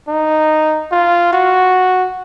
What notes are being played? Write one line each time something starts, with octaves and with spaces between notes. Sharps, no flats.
D#4
F4
F#4